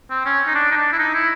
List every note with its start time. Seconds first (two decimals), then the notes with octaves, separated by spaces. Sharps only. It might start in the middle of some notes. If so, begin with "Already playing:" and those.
0.10 C4
0.25 C#4
0.47 D#4
0.55 D4
0.71 D#4
0.77 D4
0.92 E4
0.99 D#4
1.14 E4